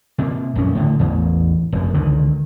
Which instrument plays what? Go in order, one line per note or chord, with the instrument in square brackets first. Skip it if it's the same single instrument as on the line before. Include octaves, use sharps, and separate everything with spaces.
[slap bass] C3 A3 A#3
A#1 F#2 C#4
A2 D3
A1 E2
F1 F#2
C#2 D3 D#3